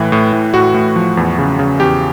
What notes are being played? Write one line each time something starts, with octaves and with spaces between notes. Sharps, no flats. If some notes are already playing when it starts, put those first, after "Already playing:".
Already playing: A2 E3
A2
A2
A2 F#4
A2
F3
E2
C#3
C#3
E2 G4